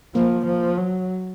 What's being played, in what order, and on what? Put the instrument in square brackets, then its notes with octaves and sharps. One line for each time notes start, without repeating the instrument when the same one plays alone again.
[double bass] F3 [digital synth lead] A#3
[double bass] F3
F#3